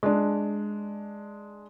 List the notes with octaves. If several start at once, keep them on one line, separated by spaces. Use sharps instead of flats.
G#3 D4